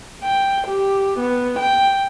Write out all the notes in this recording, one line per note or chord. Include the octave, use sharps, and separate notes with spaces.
G5
G4
B3
G5